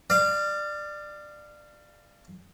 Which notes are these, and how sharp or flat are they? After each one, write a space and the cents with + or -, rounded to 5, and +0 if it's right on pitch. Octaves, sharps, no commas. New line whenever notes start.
D5 +20 F5 -20